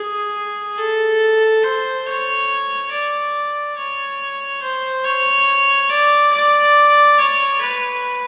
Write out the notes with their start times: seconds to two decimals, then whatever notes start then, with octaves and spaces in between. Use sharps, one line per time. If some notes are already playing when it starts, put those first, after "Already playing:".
Already playing: G#4
0.78 A4
1.63 C5
2.06 C#5
2.91 D5
3.76 C#5
4.62 C5
5.05 C#5
5.90 D5
6.32 D5
7.19 C#5
7.61 B4